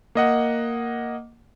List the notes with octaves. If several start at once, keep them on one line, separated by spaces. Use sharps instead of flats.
A#3 D#5 F#5